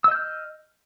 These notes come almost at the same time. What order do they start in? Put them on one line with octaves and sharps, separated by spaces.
E6 D#5 G6 F6